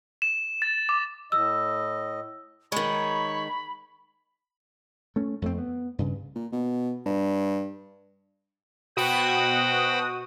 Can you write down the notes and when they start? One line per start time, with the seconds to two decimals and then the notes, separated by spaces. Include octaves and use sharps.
0.22 E7
0.62 A6
0.89 D6
1.32 A2 D#5 E6
2.72 D#3 G#3 C#5 B5
5.16 A3 C#4
5.42 F2 A3 C4
5.58 B3
5.99 G2 C#3
6.35 A#2
6.52 B2
7.06 G2
8.97 B2 F#4 C5 G5 B5 D#6